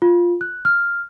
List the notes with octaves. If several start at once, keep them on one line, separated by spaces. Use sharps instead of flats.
F4
F#6
F6